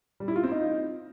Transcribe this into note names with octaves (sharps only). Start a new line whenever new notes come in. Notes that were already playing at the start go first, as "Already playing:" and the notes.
G3
E4
F4
C4
D#4